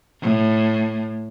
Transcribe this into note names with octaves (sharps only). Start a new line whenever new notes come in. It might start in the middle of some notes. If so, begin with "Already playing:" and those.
A2